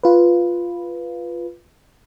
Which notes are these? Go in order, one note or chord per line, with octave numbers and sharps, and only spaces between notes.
F4 B4